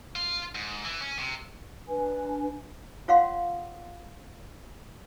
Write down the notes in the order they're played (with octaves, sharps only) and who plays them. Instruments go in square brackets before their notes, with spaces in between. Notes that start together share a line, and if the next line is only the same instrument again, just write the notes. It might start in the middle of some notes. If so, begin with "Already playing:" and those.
[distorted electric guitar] F4
G#2
E3
C#4
C3
[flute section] D4 B4 G#5
[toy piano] F4 C#5 F5 F#5 C6